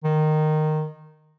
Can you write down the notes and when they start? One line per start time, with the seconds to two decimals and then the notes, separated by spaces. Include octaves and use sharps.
0.04 D#3